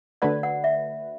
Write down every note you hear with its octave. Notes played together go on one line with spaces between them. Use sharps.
D3 A3 F#4 B4 D5
F#5
E5